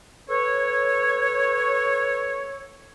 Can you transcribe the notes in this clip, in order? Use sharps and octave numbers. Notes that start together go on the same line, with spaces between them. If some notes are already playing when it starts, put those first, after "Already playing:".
A4 B4 C#5